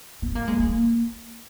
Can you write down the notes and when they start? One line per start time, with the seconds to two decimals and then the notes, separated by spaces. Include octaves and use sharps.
0.22 B3
0.35 A#3
0.48 G#3
0.60 A#3